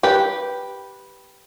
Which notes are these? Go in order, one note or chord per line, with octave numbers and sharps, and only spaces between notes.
G4 B4